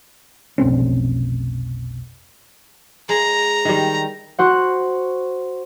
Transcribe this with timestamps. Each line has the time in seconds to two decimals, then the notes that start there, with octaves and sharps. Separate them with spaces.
0.58 F1 B1 C4 C#4
3.09 G#3 A#5
3.65 D#3 G3
4.39 F#4 C5 F#5